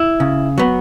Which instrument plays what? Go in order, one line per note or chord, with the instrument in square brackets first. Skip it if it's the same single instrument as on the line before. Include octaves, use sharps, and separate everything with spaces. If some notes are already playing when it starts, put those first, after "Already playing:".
Already playing: [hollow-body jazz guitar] E4
C#3
F#3 B3